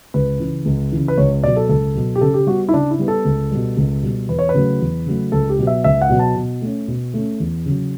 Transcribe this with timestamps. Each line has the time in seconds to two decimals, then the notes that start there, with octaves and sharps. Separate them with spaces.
0.14 C#2 B4
0.40 C#3 E3
0.65 C#2
0.92 C#3 E3
1.08 B4
1.18 C#2 C#5
1.44 B2 F#3 D5
1.56 A4
1.69 C#2 A4
1.95 B2 F#3
2.15 G4
2.21 C#3 A4
2.34 G4
2.47 G3 B3 F#4
2.69 E4
2.73 C#3 D4
2.91 E4
2.99 G3 B3
3.08 A4
3.25 C#2
3.51 B2 G3
3.77 C#2
4.03 B2 G3
4.29 E2 B4
4.39 C#5
4.49 B4
4.54 C#3 F#3 A3
4.81 E2
5.06 C#3 F#3 A3
5.32 C#2 A4
5.49 G4
5.59 B2 F#3 B3
5.67 E5
5.84 C#2 E5
6.02 F#5
6.09 B2 F#3 B3
6.19 A5
6.36 B2
6.62 A3 C#4
6.88 B2
7.14 A3 C#4
7.40 E2
7.66 C#3 F#3